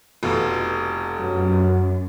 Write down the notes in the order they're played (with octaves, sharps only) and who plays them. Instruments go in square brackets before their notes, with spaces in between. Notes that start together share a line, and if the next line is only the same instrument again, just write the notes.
[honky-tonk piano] F1 [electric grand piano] B2 F4 A4
[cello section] F#2 [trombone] F#3